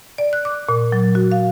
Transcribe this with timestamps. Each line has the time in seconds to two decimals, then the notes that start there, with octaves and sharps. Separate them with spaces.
0.18 D5
0.33 F#6
0.45 D6
0.69 A#2
0.92 F#3
1.15 F#4
1.32 F5